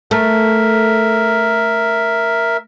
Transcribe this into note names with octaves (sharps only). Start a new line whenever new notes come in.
A3 A#4 E5